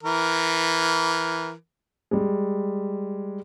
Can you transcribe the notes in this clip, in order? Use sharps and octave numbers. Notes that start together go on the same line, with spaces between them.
E3 A#4
G3 G#3